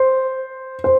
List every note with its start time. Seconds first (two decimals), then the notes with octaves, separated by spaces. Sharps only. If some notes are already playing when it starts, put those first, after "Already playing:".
Already playing: C5
0.84 C5